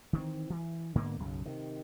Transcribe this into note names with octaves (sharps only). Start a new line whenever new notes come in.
D#3 E3 A3 C4
E3
G#2 D3 A#3 B3
B1 F#2 C#3
C3 D#3